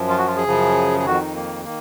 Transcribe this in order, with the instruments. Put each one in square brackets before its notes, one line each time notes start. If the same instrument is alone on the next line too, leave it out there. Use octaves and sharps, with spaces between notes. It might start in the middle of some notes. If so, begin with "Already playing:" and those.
Already playing: [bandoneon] F#2 F3
F4
F#4
F4
G#4
F#2 C#3 F3
G#4
F2 D#3 F#4
D#4
A#3
D#3 A#3